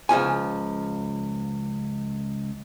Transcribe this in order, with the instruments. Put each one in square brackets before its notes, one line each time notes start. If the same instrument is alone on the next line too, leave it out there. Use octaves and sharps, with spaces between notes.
[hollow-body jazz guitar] C#2 D#3 F3 G#5